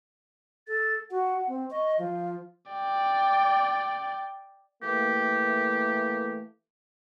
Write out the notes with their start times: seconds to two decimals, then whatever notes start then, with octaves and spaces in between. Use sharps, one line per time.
0.68 A4 A6
1.11 F#4 F#5
1.48 C4
1.70 D#5 C#6
1.99 F3 F5
2.72 D5 G5
4.83 E3 A3 A#3 G4